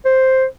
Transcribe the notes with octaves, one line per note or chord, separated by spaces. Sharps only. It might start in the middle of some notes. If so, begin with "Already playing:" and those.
C5